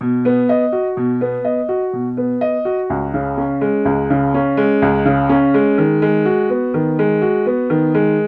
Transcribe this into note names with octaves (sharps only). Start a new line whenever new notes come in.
B2
B3
D#5
F#4
B2
B3
D#5
F#4
B2
B3
D#5
F#4
C#2
C#3
C#4
G#3
C#2
C#3
C#4
G#3
C#2
C#3
C#4
G#3
D#3
G#3
F#4
B3
D#3
G#3
F#4
B3
D#3
G#3